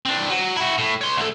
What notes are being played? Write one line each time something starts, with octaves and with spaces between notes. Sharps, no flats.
C4 D4
F#3
E4 F#4
A2
C#5 C6
D2 A4